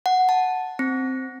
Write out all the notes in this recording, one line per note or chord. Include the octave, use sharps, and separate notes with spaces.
F#5
A5
C4